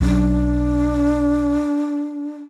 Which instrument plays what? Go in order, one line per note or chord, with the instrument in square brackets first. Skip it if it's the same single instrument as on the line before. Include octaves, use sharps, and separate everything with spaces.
[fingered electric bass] B1 F#3 C#4 [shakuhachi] D4